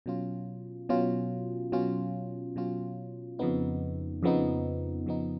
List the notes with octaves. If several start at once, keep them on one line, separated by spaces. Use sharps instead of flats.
B2 F#3 C#4 F4
B2 F#3 C#4 F4
B2 F#3 C#4 F4
B2 F#3 C#4 F4
F2 C#3 F3 B3 D#4
F2 C#3 F3 B3 D#4
F2 C#3 F3 B3 D#4